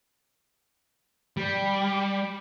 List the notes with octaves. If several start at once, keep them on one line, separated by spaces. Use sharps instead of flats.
G3